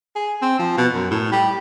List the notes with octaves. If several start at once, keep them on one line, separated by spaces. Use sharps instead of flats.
G#4
C4
F3
B2
F#2
A2
G3